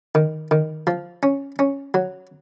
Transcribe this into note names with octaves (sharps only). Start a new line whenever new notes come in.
D#3
D#3
F3
C#4
C#4
F#3